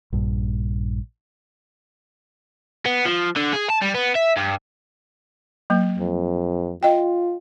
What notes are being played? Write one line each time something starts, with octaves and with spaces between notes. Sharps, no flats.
A#1 G2
B3
F3
D3
G#4
A5
G3
B3
E5
G2
F#3 A#3
F2
F4 D#5 G5